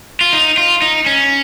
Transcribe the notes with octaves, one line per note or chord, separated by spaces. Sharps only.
F4
D#4
F4
D#4
C#4